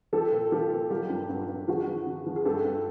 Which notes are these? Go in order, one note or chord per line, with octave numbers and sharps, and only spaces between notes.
F3 G4 A4
A#2
F3 F4 G4
A#2
F#3 F4 G4
G2
G2
G2
F3 F#4 G#4
F3
D3
F3
G#4
G2 G4 A4
G2